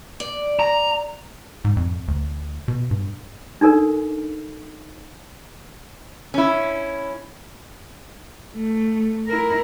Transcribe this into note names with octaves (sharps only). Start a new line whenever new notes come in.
D5
A#5
G#2
F2
D2
B2
G2
D4 D#4 A4 A#4
C#4 E4
A3
E4 A#4